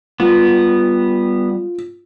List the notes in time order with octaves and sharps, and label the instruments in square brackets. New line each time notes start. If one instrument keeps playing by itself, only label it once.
[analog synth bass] G3 [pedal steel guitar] B3 [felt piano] F4